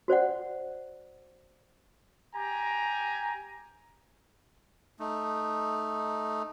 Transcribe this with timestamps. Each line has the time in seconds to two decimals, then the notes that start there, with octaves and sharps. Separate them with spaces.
0.08 F#4 C5 D5 F#5
2.34 G4 G#5 A#5
5.00 A3 D#4